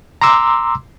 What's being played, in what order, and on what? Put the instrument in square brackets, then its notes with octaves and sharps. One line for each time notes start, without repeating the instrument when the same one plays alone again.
[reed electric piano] A#5 C6 D6 E6